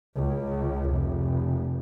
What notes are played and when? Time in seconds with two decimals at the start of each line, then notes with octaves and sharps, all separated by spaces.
0.16 C#2
0.91 F1